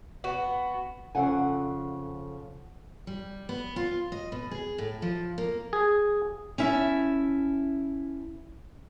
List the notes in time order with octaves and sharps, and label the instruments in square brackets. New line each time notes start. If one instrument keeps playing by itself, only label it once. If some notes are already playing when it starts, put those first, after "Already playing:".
[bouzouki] B3 F#4
[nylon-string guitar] F2 C#3 A4 F#5 G#5
[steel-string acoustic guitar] G3
B3
F4
D#5
B2
G#4
A2
F3
A#3
[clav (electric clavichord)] G#4
[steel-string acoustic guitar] C#4 E4 E5 G5 A5